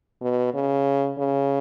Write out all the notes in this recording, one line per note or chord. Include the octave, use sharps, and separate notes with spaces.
B2
C#3
C#3